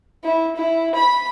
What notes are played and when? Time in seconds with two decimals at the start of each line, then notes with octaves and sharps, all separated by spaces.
0.24 E4
0.56 E4
0.95 B5